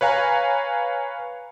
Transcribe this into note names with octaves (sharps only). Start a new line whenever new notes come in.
B4 C#5 F5 G#5 A#5